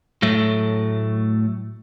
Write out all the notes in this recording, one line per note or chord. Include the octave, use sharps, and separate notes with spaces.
A2 F#3 A3